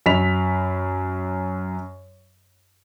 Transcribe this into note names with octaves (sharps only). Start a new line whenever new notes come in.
F#2 B5 B6 F7